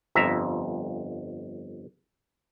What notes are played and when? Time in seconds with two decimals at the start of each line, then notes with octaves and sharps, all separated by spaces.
0.15 G1 F2 E5 A#5